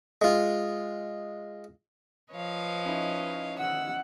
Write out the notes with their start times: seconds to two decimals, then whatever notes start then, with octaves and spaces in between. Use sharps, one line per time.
0.22 G#3 F4
2.32 F3 B4 C#5 D#5 F5
2.85 C#4 D#4 E4
3.58 F#5 E6